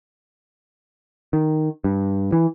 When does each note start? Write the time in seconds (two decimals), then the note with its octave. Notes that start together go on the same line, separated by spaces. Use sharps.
1.33 D#3
1.84 G2
2.32 E3